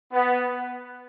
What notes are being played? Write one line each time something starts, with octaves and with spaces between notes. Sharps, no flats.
B3